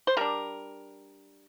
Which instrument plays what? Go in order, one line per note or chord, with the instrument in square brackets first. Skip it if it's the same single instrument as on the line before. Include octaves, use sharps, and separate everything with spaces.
[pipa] C5
G3 D4 A#4